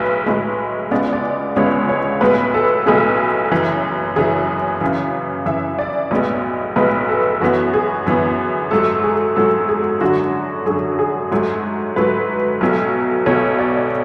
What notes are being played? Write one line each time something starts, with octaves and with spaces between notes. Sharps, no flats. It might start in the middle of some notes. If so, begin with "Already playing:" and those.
Already playing: B1 A2 G#3 B4
B1 A2 G#3
C#2 C#3 G#3 B3 D5
D5
C#2 C#3 G#3 B3 C#5
C#5
B1 A2 G#3 B3 B4
A4
B1 A2 G#3 B3 G#4
F#1 F#2 E3
F#1 F#2 E3 G#4
F#2 C#3 E3
F#2 C#3 E3 E5
D5
B1 A2 G#3 B3
B1 A2 G#3 B3 B4
A4
F#2 E3 B3 F#4
G#4
F#2 E3 B3
G#2 F#3 A3 A4
G#4
G#2 F#3 A3 A4
G#4
F#2 D3 F#3 F#4
F#2 D3 F#3 G#4
G#4
G#2 F#3 A3
G#2 F#3 A3 B4
B1 B2 F#3 A3
B1 B2 F#3 A3 C#5
D5